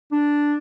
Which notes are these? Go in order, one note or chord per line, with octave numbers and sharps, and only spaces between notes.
D4